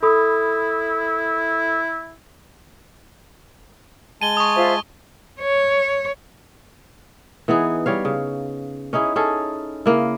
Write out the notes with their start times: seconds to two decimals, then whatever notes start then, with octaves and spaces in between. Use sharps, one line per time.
0.03 E4 A4 B5 D#6
4.22 G#3 G#5 A5 D#7 G7
4.37 C#6 D#6
4.56 F4 C5 E5
5.40 C#5
7.48 E3 B3 D#4 G#4
7.86 G3 C#5 F5
8.05 C#3
8.93 C#4 D#4 E4 G#4
9.16 C#4 G#4 A4
9.86 C#3 A#3 E4